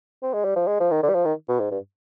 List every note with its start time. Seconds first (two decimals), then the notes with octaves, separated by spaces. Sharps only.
0.22 C4
0.34 G#3
0.45 G3
0.56 F3
0.67 G#3
0.80 F3
0.91 D#3
1.03 D3
1.09 G3
1.14 F3
1.25 D#3
1.49 B2
1.60 G#2
1.71 G2